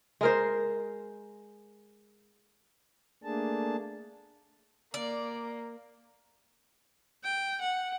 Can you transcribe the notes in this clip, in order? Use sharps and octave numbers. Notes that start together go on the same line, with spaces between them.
G#3 A#4 C5
A3 A#3 D4 G#4 A5
A#3 D5
G5
F#5